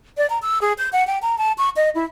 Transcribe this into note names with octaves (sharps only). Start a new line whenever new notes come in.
D5
A#5
E6
G#4
G6
F#5
G5
A#5
A5
C#6
D#5
E4